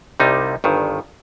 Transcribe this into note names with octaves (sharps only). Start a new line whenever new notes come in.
C2 C3 G3 D#4
G1 G2 D#3